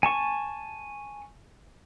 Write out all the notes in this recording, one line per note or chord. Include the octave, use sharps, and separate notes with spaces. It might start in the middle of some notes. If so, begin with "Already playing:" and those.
G#5 A5 C#6